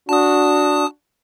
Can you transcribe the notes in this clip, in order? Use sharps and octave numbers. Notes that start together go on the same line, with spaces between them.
D4 F#4 A5 D#6